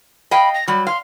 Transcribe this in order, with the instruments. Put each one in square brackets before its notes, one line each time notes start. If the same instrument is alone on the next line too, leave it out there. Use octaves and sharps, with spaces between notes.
[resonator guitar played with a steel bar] D#5 F5 G5 [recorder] B5
[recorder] A#6
[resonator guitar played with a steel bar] F#3 G3 [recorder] B5
[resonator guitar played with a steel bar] F5 [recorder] C6